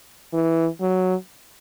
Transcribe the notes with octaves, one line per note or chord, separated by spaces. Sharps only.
E3
F#3